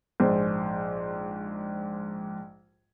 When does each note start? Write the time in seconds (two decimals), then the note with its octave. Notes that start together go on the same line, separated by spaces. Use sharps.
0.20 A#1 G#2 C5